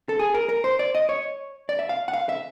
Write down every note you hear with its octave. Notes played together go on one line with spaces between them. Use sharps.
A4
G#4
A#4
A#4
C5
D5
D#5
C#5
D5
E5
F5
F#5
F5
E5